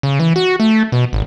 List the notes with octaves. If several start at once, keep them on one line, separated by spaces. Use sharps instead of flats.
C#3
E3
F#4
A3
B2
G#1